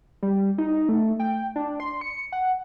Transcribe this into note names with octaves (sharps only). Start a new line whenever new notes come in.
G3
D#4
A3
G5
D4
C6
C#7
F#5